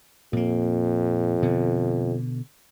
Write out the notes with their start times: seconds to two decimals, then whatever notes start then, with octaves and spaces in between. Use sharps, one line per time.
0.33 F2 A#2 A#3
1.42 B2 D3